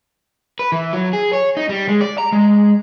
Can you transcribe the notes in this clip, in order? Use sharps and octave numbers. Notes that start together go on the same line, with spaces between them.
B4
E3
F#3
G#4
C#5
D#4
G3
G#3
D5
A#5
G#3